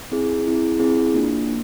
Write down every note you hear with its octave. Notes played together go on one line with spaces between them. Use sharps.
C4 E4 G#4
C4 E4 G#4
C4 E4 G#4
A#3 D4 F4
A#3